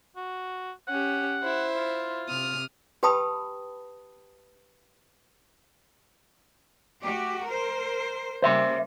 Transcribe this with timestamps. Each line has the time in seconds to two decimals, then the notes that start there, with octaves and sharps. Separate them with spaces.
0.16 F#4
0.88 C#4 G4 F#5
1.42 E4 C5
1.76 F4
2.28 C3 D#6 F6
3.03 G4 B4 G5 A5 B5 D#6
7.02 A3 F#4 G4
7.47 A#4 C5
8.42 C#3 G3 A#3 C5 E5 C6